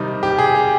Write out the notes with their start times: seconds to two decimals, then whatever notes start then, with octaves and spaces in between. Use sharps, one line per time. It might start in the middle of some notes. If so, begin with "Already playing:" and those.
Already playing: C3 D#3 G3 D#4
0.23 G4
0.38 G#4
0.55 G4